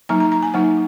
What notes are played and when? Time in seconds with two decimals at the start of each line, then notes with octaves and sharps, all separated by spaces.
0.09 F#3 A#3 D#4 A#5
0.20 A#5
0.32 A#5
0.43 G#5
0.54 F#3 A#3 D#4 F#5